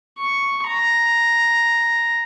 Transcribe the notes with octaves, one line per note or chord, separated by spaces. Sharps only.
C#6
A#5